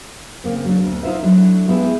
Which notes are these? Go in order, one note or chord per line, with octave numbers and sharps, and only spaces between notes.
C#3 A#3 C4
F#3 D4
D2 B2
D#4 F4 C5 E5
F#3 A3 D4 E4
G#3 B3 E4 G4 G#4